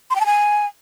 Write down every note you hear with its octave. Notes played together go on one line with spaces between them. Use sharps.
C6
G5
A5
G#5